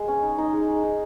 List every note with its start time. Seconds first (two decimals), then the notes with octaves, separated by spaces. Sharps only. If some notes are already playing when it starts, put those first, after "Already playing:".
Already playing: G#3
0.08 C#4
0.23 D#4
0.38 D#4
0.53 G#3
0.68 G#3
0.83 D#4